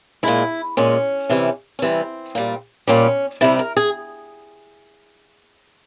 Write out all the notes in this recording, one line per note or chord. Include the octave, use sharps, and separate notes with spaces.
A#2 G#3 E4
A#2 G#3 C#4
C3 E3 G3
C#4
C3 E3 G3 C4
A#2 G3
A#2 G3 C#4
C3 G3 E4
A#4
G#4